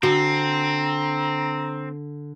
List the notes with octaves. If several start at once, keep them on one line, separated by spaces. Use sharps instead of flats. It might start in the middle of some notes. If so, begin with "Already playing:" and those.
D3 C4 F#4 A#5